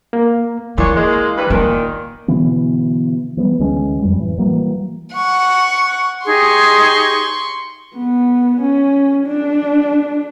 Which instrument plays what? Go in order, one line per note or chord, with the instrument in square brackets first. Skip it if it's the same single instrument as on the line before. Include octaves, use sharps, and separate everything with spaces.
[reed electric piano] A#3
[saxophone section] A#2 D4 C#5 [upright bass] E3
[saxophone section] G#3 A#3
G2 B4
[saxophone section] A#2 D#3 [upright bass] A#3 D#4
[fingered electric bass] B2 D3 E3 B3
E3 G3 B3
D2 E3 G#3 C#4
F2 G3
A2 E3
E3 F#3 G3 A#3
[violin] F#5 [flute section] C#6
[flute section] D#4 G4 G#4 [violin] C6 C#6
[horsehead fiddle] B3
C#4
D4